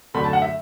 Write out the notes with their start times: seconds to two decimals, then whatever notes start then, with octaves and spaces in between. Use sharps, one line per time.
0.14 F#2 D3 A3 B5
0.24 A5
0.33 F#5
0.42 E5